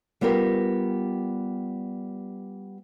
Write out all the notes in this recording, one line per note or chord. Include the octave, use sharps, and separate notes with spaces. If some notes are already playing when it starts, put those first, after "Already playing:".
G3 B3 F4 G4 A#4